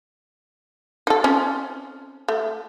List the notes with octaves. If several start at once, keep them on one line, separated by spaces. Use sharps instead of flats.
D#4 A4
C4 C#4 F4
A3